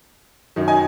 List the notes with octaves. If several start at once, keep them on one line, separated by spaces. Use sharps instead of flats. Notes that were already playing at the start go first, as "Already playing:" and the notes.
F#2 D#3 F#3
D#5 G#5